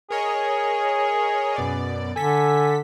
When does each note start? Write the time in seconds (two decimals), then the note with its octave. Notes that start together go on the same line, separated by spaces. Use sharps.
0.10 G#4 A#4 C#5 D#5
1.56 F#2 B2 D5
2.16 D3 A4 G#5 B6